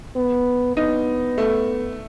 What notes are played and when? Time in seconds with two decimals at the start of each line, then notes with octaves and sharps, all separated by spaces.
0.16 B3
0.77 B3 D#4
1.38 A3